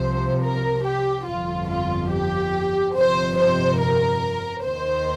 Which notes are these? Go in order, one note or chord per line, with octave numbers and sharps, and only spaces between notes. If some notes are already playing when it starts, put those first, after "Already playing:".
Already playing: C2 C3 F3 C5
A#4
G4
G1 F2 F3 F4
F4
G4
G1 F2 C3 C5
C5
A#4
D#2 D#3 C5